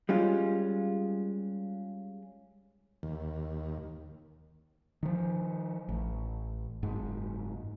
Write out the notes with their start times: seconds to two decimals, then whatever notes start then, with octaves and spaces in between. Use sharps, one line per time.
0.09 G3 G#3 C#4 F4
3.03 D#2
5.03 D#3 F3
5.89 A1
6.83 F#1 G#2